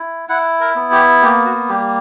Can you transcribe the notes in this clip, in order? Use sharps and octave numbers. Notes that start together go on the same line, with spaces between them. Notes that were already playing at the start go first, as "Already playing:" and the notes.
Already playing: E4
E4 F#5
A#4
B3
G4
A#3 G4
F#4
G3 G4